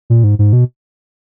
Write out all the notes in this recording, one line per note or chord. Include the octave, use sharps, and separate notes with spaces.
A#2
G#2
G#2
B2